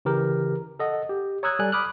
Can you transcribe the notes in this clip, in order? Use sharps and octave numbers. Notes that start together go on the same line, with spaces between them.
C#3 E3 G4 A#4
A4 D#5 F#5
G4
C#5 A#5 D#6 E6 F#6 G#6
G3 A4 D5 G#5 F#6
B5 D6 D#6 F6 F#6